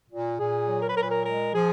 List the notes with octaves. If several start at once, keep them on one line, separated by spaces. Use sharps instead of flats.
A#2
A#2 G#4
F#3
A#4
B4
A#2 A#4
B4
A#4
G#3 A#4
F3 G#4